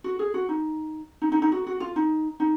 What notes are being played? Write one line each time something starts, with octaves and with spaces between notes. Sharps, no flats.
F#4
G#4
F#4
D#4
D#4
D#4
D#4
F#4
F#4
F4
D#4
D#4